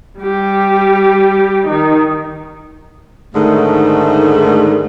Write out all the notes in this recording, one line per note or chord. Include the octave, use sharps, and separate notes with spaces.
G3 G4
D#3 D#4
G#2 D3 D#3 A3